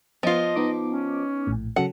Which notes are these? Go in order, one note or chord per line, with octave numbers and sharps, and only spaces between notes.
F3 B3 F4 D#5
B3 D#4 D6
C#4
A#1 A2
C#3 F#3 A4 F#5